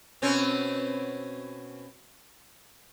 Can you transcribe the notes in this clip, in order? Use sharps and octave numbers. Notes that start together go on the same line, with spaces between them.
B2 C4 C#4